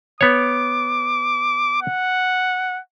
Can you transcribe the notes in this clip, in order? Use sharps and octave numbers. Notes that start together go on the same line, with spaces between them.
B3 C#5 D6
F#5